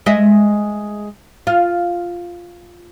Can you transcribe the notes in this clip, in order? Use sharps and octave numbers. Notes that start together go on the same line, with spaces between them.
G#3 D#5 E5
F4